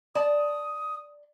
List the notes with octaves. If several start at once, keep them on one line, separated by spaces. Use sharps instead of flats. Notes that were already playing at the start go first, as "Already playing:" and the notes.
D5 A5 D#6